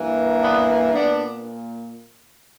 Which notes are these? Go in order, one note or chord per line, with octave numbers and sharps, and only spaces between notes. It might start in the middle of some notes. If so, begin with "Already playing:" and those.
Already playing: G2 E3 A#3
B3 D4
A#2 A#3 B3 D4